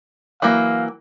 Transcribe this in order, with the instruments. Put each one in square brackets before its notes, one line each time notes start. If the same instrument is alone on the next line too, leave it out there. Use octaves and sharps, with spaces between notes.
[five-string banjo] E3 F#3 A#3 [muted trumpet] F5